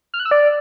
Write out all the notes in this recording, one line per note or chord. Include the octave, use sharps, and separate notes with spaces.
F6
F#6
E6
D5